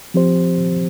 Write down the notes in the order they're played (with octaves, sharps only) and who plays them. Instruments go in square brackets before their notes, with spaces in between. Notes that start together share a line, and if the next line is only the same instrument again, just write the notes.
[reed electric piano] F3 C4 G4 C5